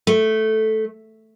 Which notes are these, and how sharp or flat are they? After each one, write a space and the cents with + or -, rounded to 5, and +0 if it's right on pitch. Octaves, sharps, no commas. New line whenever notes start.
A3 -5